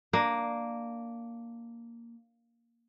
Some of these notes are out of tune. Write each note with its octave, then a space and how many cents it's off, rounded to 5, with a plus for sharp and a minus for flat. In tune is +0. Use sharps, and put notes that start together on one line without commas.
A#3 +0 D4 +10